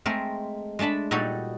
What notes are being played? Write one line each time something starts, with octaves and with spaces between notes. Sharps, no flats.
G#3 A3 C4 A#4
G#3 A3 D4 A5 B5
A#2 G3 D#4 F#4 A4 C#5